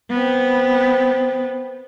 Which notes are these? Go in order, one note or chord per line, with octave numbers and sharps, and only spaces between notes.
B3 C4